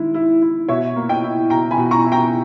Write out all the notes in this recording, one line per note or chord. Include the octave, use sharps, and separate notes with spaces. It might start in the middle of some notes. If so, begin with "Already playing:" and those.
Already playing: D#3 G#3 E4
E4
E4
B2 C#5 E5
A#3
D#5 G5
E4
B2 G5 A#5
G#5 B5
B2
A#5 C#6
E4
G5 A#5